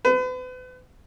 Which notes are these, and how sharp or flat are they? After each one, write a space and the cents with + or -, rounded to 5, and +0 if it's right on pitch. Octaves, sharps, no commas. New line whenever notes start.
B4 +40